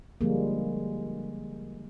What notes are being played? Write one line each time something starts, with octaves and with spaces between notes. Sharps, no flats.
D3 F3 G3 G#3 A#3